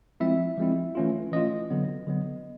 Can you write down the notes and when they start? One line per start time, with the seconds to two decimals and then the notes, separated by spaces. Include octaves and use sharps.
0.20 F3 G#3 C4 E4 E5
0.58 F3 G#3 C4 E4
0.95 E3 A3 C#4 F4
1.32 E3 A3 C#4 F4 D#5
1.70 D3 F#3 B3
2.07 D3 F#3 B3